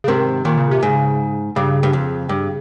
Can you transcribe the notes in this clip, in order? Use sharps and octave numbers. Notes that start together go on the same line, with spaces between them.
C#3
G#2 C3 D#3
A#2 D#3
C#3
C3
G#2 C#3
G2 C#3
G2
F2
G2